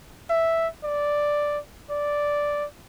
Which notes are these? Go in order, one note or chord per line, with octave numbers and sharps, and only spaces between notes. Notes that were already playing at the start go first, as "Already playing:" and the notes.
E5
D5
D5